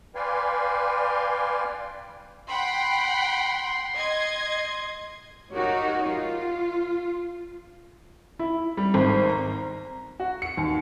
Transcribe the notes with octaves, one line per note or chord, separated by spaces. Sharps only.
B4 D5 F5 G5 G#5 C6
F#5 G5 B5 C6
D#5 G#6
D#4 F#4 G4 A#4 C#5
F4
E4
G3
G#1
A#5
F#4
C#7
D#2